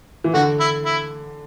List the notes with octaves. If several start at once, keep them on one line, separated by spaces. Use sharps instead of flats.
E3
D3 F#4
E4
E4